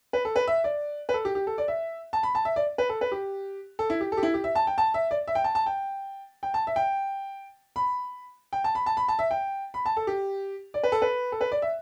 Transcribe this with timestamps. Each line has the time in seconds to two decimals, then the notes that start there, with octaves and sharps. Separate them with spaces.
0.13 B4
0.25 A4
0.36 B4
0.47 E5
0.64 D5
1.09 B4
1.14 A4
1.25 G4
1.35 G4
1.47 A4
1.58 D5
1.68 E5
2.13 A5
2.23 B5
2.35 A5
2.45 E5
2.56 D5
2.78 B4
2.89 A4
3.01 B4
3.12 G4
3.79 A4
3.90 E4
4.01 G4
4.12 A4
4.17 G4
4.23 E4
4.34 G4
4.44 E5
4.55 A5
4.67 G5
4.78 A5
4.94 E5
5.11 D5
5.28 E5
5.35 G5
5.44 A5
5.55 A5
5.66 G5
6.43 G5
6.54 A5
6.67 E5
6.76 G5
7.76 B5
8.53 G5
8.64 A5
8.75 B5
8.86 A5
8.97 B5
9.08 A5
9.19 E5
9.31 G5
9.74 B5
9.86 A5
9.97 A4
10.07 G4
10.74 D5
10.83 B4
10.92 A4
11.02 B4
11.32 A4
11.41 B4
11.52 D5
11.62 E5